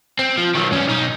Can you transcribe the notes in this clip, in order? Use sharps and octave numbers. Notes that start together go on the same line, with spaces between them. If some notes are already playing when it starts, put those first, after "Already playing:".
C4
F3
D#3 F#3
G2 C#4
B1 D#4